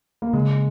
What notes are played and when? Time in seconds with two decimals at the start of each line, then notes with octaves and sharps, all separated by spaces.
0.22 A#3
0.33 C#3 G#3